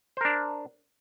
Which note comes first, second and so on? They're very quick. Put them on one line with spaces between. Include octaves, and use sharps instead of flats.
C5 A#4 D4